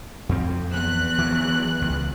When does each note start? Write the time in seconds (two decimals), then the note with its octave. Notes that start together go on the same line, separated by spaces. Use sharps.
0.29 F2 C4
0.72 E2 F#6
1.18 E3 F#3
1.82 C#2